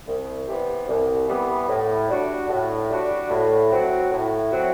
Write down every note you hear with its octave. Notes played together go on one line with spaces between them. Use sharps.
C2
C3 E3 G3 B3
C2
C3 E3 G3 B3
A2
G3 D4 F#4
A2
G3 D4 F#4
A2
F#3 C4 F#4
A2
F#3 C4 F#4